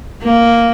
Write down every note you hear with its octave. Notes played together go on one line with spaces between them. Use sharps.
A#3